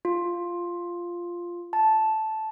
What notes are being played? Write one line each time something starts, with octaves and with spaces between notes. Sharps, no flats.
F4
A5